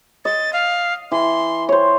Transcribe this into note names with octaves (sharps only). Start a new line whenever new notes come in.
D#5 A6
F5
E3 C6
C5 C#5